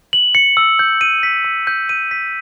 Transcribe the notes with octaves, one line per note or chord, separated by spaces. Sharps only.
F#7
C#7
E6
G6
D#7
B6
E6
G6
D#7
B6